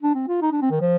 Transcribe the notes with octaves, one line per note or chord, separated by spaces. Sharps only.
D4
C4
F4
D#4
D4
C4
D#3
F3